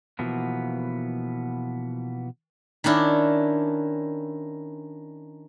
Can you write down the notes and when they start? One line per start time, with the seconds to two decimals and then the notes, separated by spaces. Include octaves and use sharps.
0.19 B2 E3 F3 A#3 B3
2.84 D#3 C#4 D4 E4